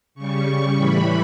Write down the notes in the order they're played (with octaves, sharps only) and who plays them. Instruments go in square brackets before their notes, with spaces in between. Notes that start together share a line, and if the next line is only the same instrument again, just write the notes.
[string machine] C#3 G3 C#6
C#3 G3 C#6
A2 E3 G3 B5